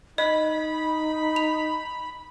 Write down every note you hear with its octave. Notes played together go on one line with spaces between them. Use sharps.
D#4 D#5 B5
F7